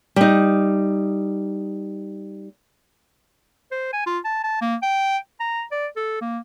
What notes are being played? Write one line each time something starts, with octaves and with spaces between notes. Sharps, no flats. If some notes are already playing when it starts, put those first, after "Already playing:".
G3 D#4
C5
G#5
F4
A5
A5
A#3
G5
A#5
D5
A4
A#3